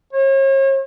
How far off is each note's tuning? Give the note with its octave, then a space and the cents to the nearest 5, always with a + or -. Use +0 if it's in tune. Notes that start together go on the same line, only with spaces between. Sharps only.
C#5 -40